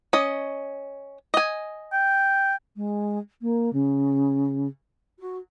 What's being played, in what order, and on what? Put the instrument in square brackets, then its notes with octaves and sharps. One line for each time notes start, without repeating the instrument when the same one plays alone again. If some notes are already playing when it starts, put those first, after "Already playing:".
[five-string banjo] C#4 D#5
D#5 G#5
[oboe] G5
[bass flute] G#3
A#3
C#3
F#4